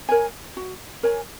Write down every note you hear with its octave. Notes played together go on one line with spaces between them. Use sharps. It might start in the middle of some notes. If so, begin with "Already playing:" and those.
A#4 C#5 G#5
F#4
A#4 C#5 G#5